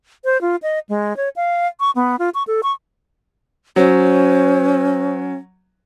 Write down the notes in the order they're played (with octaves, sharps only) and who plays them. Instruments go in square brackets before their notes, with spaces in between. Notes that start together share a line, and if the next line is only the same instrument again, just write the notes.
[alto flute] C5
F4
D#5
G#3
C#5
F5
C#6
B3
F4
C#6
A4
C#6
[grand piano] F#3 [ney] C#4 [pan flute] C5